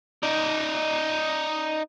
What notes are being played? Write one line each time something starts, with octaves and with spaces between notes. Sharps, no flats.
D#4 D5